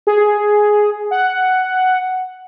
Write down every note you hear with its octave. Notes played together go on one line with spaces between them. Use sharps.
G#4
F#5